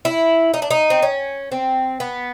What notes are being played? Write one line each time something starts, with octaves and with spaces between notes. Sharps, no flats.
E4
D#4
D4
D#4
C4
C#4
C4
B3